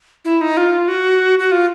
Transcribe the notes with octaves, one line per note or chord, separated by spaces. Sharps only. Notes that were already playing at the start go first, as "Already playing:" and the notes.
E4
D#4
F4
F#4
F#4
F4